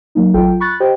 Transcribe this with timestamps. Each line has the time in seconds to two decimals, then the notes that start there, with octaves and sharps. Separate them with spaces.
0.15 F#3 A#3 D#4
0.34 A1 F#3 F4 A4 G5
0.60 B5 C#6 F#6 A6
0.80 G4 C5 D#5 G5